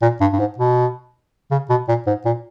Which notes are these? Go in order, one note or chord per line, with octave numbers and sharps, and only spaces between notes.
A#2
G2
G2
G#2
B2
C#3
B2
A#2
G#2
A#2